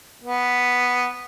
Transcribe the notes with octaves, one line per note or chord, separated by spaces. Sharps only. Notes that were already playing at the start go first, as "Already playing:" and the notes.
B3